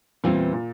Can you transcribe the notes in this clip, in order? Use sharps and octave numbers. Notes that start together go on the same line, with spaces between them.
E2 A#2 E3 G3 C4 F4
A#2